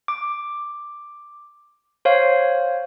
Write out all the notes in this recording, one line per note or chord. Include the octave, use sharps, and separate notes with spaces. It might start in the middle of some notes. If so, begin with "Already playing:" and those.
D6
C5 C#5 F5